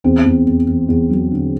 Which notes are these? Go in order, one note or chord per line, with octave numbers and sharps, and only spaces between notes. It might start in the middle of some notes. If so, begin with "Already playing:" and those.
E2 C4
E2
E2
E2
E2
F#3
D3